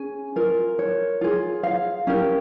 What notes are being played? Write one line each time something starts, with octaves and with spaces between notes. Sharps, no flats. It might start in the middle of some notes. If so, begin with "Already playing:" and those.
Already playing: C#4 G#4 G#5
F4 A#4
C#5
F4 G#4
F5
C#4 G4 A#4